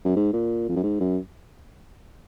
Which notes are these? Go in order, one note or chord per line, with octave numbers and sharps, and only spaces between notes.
F#2
G#2
A#2
F2
F#2
G#2
F#2